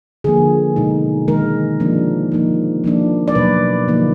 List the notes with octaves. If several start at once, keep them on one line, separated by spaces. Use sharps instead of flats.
D3 F3 A#3 G#4
B2 G#3 D#4
D#3 G#3 D#4 A#4
F3 A#3 D4
F3 A#3 D#4
F3 A#3 D4
D5
B2 F#3 A#3 B4
D3 F3 A#3 D#4